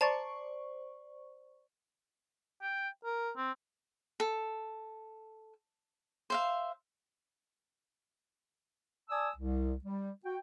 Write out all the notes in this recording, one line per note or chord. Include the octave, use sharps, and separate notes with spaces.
C5 D5 A5 A#5 C#6 A6
G5
A#4
C4
A4
C5 E5 F5
D5 G#5 A5 D#6 E6
C2
G3
F#4 G5